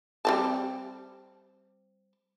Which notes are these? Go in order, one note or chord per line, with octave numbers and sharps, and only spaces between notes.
G3 C4 A5